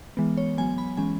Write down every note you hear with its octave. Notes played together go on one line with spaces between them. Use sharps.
E3 G#3 B3
C#5
F#3 B3 G#5
B5
E3 G#3 C#4 G#5